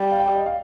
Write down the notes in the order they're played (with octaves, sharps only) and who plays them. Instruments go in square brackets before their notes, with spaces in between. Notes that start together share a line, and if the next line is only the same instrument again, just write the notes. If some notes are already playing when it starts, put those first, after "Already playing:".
Already playing: [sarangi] G3
[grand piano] F5
G5
D#5
F5